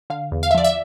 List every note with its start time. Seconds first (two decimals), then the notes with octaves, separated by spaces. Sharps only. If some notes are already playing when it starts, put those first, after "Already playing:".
0.10 D3 F5
0.32 E2
0.43 F5
0.51 E5
0.55 F3 D5
0.64 E5